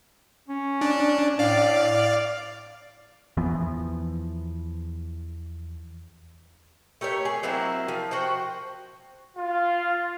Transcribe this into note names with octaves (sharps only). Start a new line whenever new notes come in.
C#4
D4
A2 D5 F5
E2 E3 F3 B3
A3 G4 A#4 C#5
G#4
F#3 A#3 C4 E4
F3
F#4 C5 G5
F4